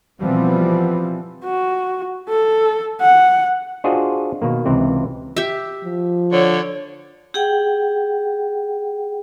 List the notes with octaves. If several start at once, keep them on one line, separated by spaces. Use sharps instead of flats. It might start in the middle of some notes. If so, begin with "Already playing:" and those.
B2 E3 F3 G3 B3 C4
F#4
A4
F#5
D4 F4 F#4 G#4 C5 D#5
B2 D#3 A#3
C#2 C3 E3 C4
G4 E5
F3
D3 C#5
G4 G#4 F#5 G5